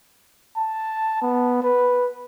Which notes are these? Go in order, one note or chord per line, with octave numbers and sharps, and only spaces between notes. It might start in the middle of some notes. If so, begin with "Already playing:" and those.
A5
B3
B4